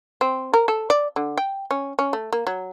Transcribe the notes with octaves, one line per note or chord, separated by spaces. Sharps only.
C4
A#4
A4
D5
D3
G5
C#4
C#4
A3
A#3
F#3